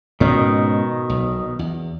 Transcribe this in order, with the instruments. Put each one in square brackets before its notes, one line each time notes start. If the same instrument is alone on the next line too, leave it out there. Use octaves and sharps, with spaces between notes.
[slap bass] G#2 C#4 [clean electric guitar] B2 D#3
[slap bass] B1
E2